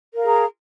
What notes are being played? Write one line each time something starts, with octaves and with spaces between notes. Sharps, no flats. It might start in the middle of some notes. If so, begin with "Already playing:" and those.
G#4 A#4 F5 A#5